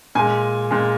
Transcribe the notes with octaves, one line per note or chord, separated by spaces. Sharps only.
A#2 G#3 G#5
A#2 G#3